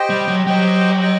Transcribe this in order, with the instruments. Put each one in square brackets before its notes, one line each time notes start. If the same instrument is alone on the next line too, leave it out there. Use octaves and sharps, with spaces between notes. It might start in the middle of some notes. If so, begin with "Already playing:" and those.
Already playing: [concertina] G4 C5 D#5 G5
[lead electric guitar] G3
F#3
[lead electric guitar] F#3 [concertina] G4 C5 D#5 G5
[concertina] D#5 G5